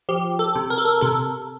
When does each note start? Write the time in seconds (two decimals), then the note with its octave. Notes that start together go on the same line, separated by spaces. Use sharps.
0.09 F3 G4
0.39 A4
0.56 C3
0.70 A#4
0.78 A4
0.85 A#4
1.01 C3 A4